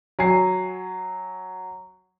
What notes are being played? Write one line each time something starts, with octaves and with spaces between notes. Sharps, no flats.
F#3 G#5 C7